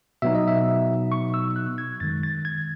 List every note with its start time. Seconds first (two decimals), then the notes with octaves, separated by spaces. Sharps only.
0.22 B2 F#3 B3 D#4 E5
0.35 D#5
0.48 E5
1.12 C#6
1.34 E6
1.56 F#6
1.78 G#6
2.00 F#2 D#3 G#3 A6
2.23 A6
2.45 G#6